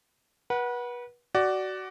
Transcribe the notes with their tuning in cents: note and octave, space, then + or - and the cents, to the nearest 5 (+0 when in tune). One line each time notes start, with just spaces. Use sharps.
B4 -30 F#5 +5
F#4 +20 D5 +0